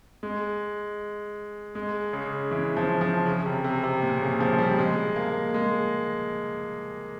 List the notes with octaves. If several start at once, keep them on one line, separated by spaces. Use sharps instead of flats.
G#3
G#3
C#3
E3
F3
F3
C#3
C3
C3
C3
A#2
C#3
F3
G3
G#3
A#3
G#3